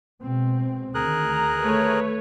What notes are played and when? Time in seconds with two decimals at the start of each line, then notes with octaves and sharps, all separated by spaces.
0.22 B2 G#3 C4
0.94 D2 D#3 G#4 A#4 F#6
1.30 A#5
1.61 A3 B4 C#5